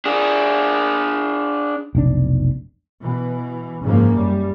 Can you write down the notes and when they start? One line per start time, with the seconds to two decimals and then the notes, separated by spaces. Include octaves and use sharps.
0.06 D4 G#4
1.95 F1 B1 D4
3.02 B2 E3
3.82 F#1 G#2 C#3 F3 A#3
4.17 F#2 G3